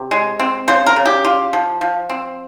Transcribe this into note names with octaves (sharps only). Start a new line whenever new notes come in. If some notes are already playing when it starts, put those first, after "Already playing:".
Already playing: C3
G#3
C4
C#3 C5
A#4
C#3
G4
F4
F3
F3
C4